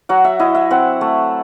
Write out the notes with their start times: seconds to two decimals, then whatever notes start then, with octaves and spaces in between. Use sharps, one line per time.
0.09 F#3 F#5
0.25 E5
0.39 E4 D#5
0.55 E5
0.71 C4 F#5
1.01 A3